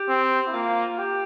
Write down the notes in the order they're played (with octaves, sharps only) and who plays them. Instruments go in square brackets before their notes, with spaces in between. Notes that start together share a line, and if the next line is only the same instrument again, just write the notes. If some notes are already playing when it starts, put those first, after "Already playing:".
Already playing: [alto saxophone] G4
[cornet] C4
[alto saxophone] E4
[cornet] A#3 [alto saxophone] F4
[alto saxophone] G4